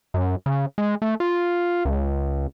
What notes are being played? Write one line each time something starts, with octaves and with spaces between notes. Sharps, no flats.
F#2
C#3
G#3
A3
F4
C#2